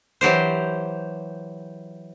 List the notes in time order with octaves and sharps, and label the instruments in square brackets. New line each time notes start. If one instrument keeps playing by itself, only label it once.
[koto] E3 F#3 G4 C5